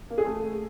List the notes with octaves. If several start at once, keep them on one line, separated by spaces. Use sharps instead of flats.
A#3
G#4
A3